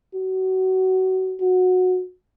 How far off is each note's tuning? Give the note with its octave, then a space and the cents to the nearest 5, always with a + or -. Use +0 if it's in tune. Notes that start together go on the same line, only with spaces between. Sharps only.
F#4 +25
F#4 -15